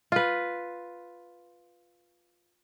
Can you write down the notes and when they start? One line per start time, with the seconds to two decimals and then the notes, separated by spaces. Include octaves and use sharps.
0.12 F4 B4